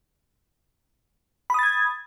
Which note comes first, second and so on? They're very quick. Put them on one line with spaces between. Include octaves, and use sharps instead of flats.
B5 D#6 A6 G#6